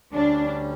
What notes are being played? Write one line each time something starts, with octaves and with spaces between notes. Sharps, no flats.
D2 D3 G3 C#4 D4